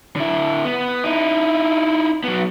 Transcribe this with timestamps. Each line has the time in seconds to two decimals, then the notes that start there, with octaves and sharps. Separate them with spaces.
0.16 D3 E4
0.65 B3
1.04 D#4 E4
2.24 F#3 B3